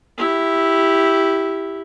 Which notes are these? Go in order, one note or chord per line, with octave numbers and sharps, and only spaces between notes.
E4 G4